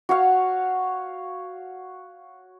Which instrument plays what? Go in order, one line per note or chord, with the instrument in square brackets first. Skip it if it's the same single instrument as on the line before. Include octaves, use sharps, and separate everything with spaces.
[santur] F#4 C#5 F5